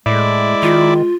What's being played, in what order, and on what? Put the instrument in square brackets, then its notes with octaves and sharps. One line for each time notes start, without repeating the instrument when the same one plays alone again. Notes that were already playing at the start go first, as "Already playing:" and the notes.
[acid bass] A2 [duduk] G#3 [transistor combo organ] E4 D5
[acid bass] D#3 [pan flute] F4